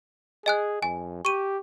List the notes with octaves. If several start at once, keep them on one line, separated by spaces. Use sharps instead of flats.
G#4 D#5 G#5 F#6
F2 G#5
G4 C#6 D#7